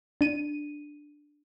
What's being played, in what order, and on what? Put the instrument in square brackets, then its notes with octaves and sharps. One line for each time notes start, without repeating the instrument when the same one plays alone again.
[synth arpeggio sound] D4 D#7